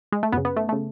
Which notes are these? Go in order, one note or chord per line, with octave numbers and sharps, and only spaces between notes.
G#3
A3
F#2 C#3 B3
B3
A3
A3
C#3